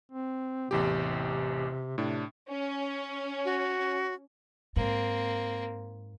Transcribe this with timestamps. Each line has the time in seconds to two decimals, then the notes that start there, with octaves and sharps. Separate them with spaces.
0.12 C4
0.71 A1 E2 C3 G4
1.98 A2 C3 D4
2.49 C#4
3.45 F#4
4.76 G#2 A#3 C4